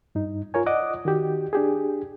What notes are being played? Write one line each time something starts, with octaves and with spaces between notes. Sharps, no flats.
G2 D#4
F4 A#4 C#5 G#5
D5 D#5 F#5 D6 D#6
D#3 F#4 G4
D4 G4 G#4